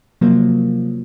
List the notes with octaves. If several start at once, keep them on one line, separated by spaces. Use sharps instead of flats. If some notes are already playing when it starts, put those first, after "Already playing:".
C3 F3 F#3 A#3